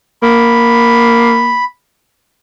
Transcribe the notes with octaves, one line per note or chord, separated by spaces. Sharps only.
A#3 B5